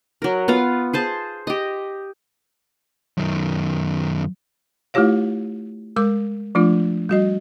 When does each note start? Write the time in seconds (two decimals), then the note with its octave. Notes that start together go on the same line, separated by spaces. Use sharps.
0.22 F#3 A#4
0.48 B3 F4 F5
0.93 G#4 C5 A5
1.47 G4 D#5
3.17 F#2 D#3
4.94 A3 E4 F4 G4 C#5 F5
5.96 G#3 A#4 D6
6.55 F3 A3 D4 F4
7.09 G3 F#4 D#5